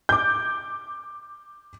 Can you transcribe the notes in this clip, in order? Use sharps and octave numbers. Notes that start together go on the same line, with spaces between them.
D6 G6